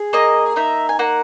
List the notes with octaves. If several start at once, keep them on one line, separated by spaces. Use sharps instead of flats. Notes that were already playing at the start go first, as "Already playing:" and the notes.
Already playing: G#4
A#3 D#5
D#4 E5
G#5
A#3 F#5